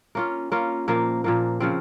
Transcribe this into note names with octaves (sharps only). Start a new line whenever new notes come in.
A#3 C#4 F4
A#3 C#4 F4
A#2 F3 A#3
A#2 F3 A#3
C#3 F3 C4